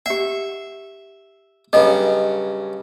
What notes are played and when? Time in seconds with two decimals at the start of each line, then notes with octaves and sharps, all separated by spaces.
0.06 G4 E5 F#5
1.73 G2 C#3 F#3 A4 D#5